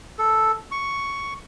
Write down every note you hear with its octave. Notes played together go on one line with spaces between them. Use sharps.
A4
C#6